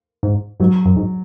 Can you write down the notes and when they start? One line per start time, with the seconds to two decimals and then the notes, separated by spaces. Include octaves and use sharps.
0.23 G#2
0.60 G#2 F#3
0.85 F#2
0.96 G#2